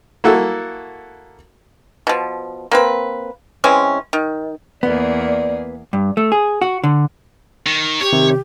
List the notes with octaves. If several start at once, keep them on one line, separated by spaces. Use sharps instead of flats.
A#3 E4 F#4 A4
B2 F3
A#3 C4 B4
E3 G#3 C4 C#4
D#3
E2 A#3 B3 G#4 D5
G2
A3
G#4
F#4
D3
D#3
G4 C#5
C3 D#3